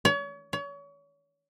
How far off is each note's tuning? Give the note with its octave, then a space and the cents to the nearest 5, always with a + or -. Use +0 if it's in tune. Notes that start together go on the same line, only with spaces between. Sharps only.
C#5 +35
C#5 +35